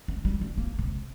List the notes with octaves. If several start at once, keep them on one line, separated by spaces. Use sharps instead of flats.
A3
G3
A3
A#3
C3